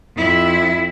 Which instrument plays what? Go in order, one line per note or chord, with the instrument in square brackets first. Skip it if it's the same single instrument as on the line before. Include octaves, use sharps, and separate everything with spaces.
[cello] F2 E4